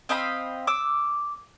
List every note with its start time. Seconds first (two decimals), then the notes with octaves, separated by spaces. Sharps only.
0.09 C4 D#5 F5 B5
0.67 D6 E6